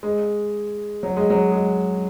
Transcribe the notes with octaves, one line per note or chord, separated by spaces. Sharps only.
G#3
F#3
G#3
F#3
G#3